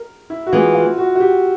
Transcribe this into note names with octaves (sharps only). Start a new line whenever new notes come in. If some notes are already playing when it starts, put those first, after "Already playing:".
Already playing: A#4
E4
F#4
E3 G#3 B3 F4
F4
F#4
F#4
G4